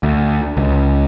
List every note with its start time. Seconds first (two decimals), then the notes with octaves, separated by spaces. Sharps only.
0.03 D2
0.57 C#2